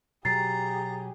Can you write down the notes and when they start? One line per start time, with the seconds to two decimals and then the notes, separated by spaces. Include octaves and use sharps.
0.25 B2 F#3 G4 G#4 A#5 A6 C7